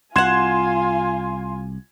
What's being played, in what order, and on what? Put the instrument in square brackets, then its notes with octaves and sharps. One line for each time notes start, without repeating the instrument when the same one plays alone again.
[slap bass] C2 [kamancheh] F4 G#5 [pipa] F#4 F#5 [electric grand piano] C6 G#6 E7